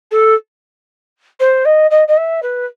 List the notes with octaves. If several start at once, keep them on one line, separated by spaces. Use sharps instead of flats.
A4
C5
D#5
D#5
D#5
E5
B4